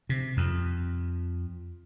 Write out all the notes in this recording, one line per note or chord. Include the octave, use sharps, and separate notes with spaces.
C3
F2